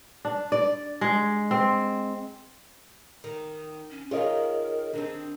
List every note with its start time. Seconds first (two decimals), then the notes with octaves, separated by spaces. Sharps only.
0.25 D4
0.52 D5
1.01 G#3
1.51 C4
3.24 D#3
3.91 C#4
4.11 D#3 F4 G#4 A#4 C#5 D#5
4.94 D#3 C4 D4